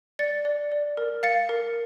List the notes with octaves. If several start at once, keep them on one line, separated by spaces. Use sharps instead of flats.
D5 A6 C#7
D5
D5
A#4
F5 A6 C#7
A#4